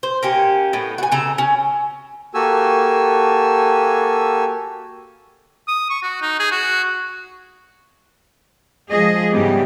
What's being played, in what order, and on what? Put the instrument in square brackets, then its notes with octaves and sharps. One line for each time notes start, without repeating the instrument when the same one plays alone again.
[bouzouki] C5
A#3 C#4 G4
A2 B3
F#4 G#5
C#3 A4 A#5
C#4
[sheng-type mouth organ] A#3 F#4 G4 A4 G#5 E6
[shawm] D#6
C#6
F#4
D#4
G#4
F#4
[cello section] F3 G#3 G#4 D#5
G#2 C#3 E3 G3 B3 G4